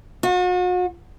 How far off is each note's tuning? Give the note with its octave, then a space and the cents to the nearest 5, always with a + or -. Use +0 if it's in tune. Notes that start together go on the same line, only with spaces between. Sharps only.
F#4 -40